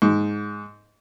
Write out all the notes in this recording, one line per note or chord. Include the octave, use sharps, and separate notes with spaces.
G#2